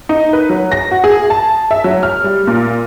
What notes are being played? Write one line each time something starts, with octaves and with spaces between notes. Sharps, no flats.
D#4
B4
F#3
A#6
F#4
G#4
A5
E5
F#3
F6
G3
A#2